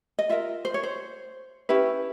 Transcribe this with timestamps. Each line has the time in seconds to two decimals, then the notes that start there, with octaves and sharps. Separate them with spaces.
0.19 D#5
0.29 F4 A#4 E5
0.65 C5
0.74 C#5
0.83 C5
1.69 C#4 E4 G4 B4